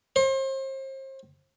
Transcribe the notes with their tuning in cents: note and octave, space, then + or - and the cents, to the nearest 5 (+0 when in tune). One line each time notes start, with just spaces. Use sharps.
C5 +35